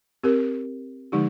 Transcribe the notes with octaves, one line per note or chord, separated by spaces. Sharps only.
C4 G4 A#4
D3 F3 G#3 D#4 G4